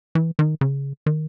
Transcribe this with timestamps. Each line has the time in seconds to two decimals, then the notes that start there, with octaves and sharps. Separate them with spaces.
0.15 E3
0.39 D#3
0.61 C#3
1.06 D#3